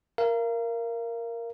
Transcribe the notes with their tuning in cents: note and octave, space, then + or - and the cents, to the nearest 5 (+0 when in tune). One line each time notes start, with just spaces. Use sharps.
A#4 +0 F5 -35